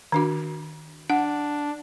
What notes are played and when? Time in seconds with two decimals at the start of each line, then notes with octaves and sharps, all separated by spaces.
0.12 D#3 D4 F#4
1.10 D4 F#5